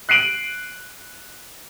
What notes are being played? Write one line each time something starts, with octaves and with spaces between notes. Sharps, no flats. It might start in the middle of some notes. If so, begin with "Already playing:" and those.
F#6 C7 D7 D#7 F#7